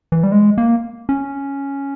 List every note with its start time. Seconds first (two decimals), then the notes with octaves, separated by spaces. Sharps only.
0.12 E3
0.23 G3
0.32 G#3
0.58 A#3
1.09 C#4